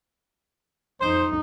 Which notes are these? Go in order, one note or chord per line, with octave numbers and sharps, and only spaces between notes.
F2 D#4 C5